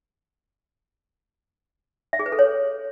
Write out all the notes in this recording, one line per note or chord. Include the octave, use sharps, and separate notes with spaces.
E5
G#4
B4
A4
C#5